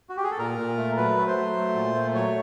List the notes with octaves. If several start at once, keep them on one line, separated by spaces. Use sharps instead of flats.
F#4
G4
G#4
A4
A#2 A#4
A#2
A3
F#3 B4
A3
C5
F#3
A3
A#2
A3
F#3 C#5